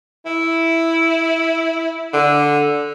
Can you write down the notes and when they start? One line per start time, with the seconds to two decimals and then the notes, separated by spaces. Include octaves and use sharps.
0.26 E4
2.13 D3